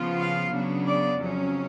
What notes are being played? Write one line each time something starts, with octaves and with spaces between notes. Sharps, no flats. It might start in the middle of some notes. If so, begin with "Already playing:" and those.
Already playing: C#3 F3 B3 F4
F5
C#3 F#3 B3 D4
D5
F2 C#3 F#3 C#4